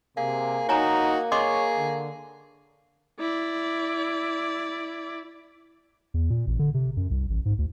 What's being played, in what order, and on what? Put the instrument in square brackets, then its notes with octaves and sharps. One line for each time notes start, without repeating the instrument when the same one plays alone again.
[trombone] C3 [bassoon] A#3 [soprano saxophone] G#4 [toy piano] F5
[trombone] D#4 [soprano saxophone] F#4 [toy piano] C#5 G#5 A#5
[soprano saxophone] G#4 [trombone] C#5 [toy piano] D#5 C6 D6
[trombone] D3
[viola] E4 D5
[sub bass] E2
A#2
A1
D3
C3
F#2
C2
A1
G#2
D2